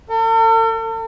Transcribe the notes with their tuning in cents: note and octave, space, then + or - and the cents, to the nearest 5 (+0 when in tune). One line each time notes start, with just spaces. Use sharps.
A4 +45